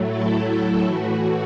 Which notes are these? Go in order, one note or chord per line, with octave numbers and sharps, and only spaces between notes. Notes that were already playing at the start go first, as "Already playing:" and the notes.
Already playing: A2 F#3 A3
E4 A4
E4 A4
A2 E3 A3 F#4